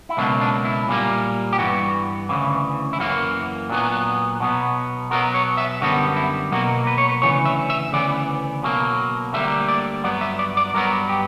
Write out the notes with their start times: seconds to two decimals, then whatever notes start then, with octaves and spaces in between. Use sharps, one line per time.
0.09 E4
0.17 C#2 B2 F#3 A#3 D4
0.41 D4
0.65 E4
0.88 A#2 G3 A#3
1.53 G4
1.58 G2 E3 B3 F#4
2.29 D2 C#3 E3
2.93 E4
2.99 F#2 E3 A#3 F#4
3.69 A#2 F#3 B3 D4
4.40 B2 F#3 B3
5.11 B2 F#3 B3 A#4
5.34 C#5
5.57 E5
5.81 F#2 D3 G3 B3 F#4
6.17 E4
6.52 B2 F#3 A#3 F#4
6.87 B4
6.98 C#5
7.09 B4
7.22 D2 C#3 E3 C#5
7.45 E5
7.70 E5
7.92 D2 C#3 E3 B3 D5
8.63 B2 F#3 A#3
9.33 D2 D3 G3 A#3 E5
9.68 D5
10.04 G2 F#3 B3 D5
10.21 E5
10.39 D5
10.57 D5
10.74 G2 F#3 B3 A#4
11.09 G4